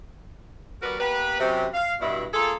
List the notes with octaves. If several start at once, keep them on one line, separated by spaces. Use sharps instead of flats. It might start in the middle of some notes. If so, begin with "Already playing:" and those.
G3 B3 F#4 A#4 B4 D5
A#3 B3 G4 B4
F#2 C3
F5
G2 B2 E4
A#3 F4 G#4 A4